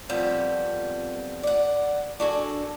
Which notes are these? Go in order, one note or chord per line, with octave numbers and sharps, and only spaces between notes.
F2 F3 G3 B3 C4
D5 F#5
D4 F#4 A4 G#5